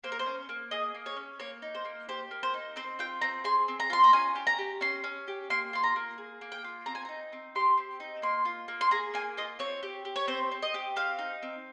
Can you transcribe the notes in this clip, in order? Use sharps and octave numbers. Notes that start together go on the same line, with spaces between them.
A#3 C5
A#4
C5
C#4
A#3
G#4 D#5
A#3
C#5
C#4
A#3 C#5
D#4
C5
A#3
G4 C5
A#3
C5
D#4
C4 C5
F4 G5
C4 A#5
G#4 C6
C4
A#5
F4 C6
A#5
C#4 G#5
G4
A#5
G4
C#4 C6
C#4
G4
A#3 C6
F4 C6
A#5
A#3
G#4
A#3
G5
F4
C4 A#5
G#5
D#4 A#5
C4
G4 C6
C4
D#4
A#3 C6
F4
A#3
C6
G#4 A#5
A#3 G#5
F4 D#5
C4 C#5
G4
G4
C#5
C4 C5
C4
D#5
G4
C4 F5
D#4
C4